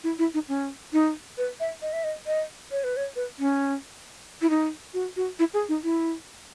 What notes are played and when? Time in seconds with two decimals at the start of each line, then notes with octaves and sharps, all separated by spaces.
0.04 E4
0.19 E4
0.34 D#4
0.48 C#4
0.93 D#4
1.38 B4
1.60 E5
1.82 D#5
1.93 E5
2.04 D#5
2.27 D#5
2.71 C#5
2.84 B4
2.97 C#5
3.16 B4
3.39 C#4
4.42 E4
4.50 D#4
4.94 F#4
5.16 F#4
5.39 E4
5.54 G#4
5.69 D#4
5.84 E4